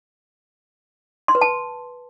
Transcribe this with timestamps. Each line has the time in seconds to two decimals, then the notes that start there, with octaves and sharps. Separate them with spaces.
1.28 C6
1.35 B4
1.41 A5